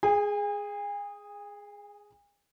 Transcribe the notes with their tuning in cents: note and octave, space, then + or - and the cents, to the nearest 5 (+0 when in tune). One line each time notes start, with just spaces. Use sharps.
G#4 +0 G#5 -40